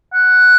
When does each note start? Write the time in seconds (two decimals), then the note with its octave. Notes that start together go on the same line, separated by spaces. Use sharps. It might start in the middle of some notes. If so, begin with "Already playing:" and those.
0.13 F#5